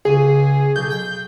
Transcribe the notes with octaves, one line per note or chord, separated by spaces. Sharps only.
C#2 G#4
B1 G6
G5